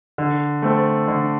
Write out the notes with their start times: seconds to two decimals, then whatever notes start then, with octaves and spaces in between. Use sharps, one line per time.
0.18 D3
0.62 A3 C4 A4
1.08 D3